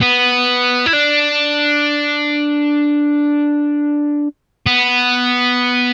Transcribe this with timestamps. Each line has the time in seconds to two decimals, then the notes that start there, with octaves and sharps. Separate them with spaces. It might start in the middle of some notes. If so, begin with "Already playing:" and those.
0.01 B3
0.86 E4
0.93 D4
4.66 B3